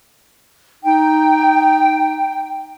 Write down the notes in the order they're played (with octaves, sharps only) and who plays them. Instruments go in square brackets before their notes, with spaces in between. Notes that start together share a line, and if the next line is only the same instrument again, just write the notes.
[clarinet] D#4 [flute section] G5